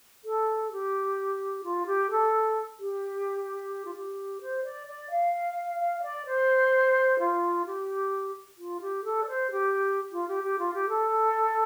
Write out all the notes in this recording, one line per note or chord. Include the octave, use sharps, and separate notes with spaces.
A4
G4
F4
G4
A4
G4
F4
G4
C5
D5
D5
F5
F5
F5
D5
C5
F4
G4
F4
G4
A4
D5
C5
G4
F4
G4
G4
F4
G4
A4